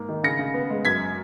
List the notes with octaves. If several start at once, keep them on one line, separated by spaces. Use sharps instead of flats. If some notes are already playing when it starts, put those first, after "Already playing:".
Already playing: G#2 A#3
D#3
C#3 A#6 C#7
C#3
B3
G#3
F#2 G#6 B6